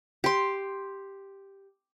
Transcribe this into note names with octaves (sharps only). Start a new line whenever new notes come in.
G4 C6